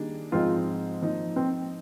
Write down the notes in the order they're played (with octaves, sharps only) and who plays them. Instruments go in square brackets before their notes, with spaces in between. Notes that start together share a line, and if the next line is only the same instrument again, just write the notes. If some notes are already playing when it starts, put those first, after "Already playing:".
Already playing: [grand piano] D#3 G3 A#3 D4 G#4
[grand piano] G#2 F3 G#3 C4 D#4 [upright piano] F4
[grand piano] F3 A#3 D#4
[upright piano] C4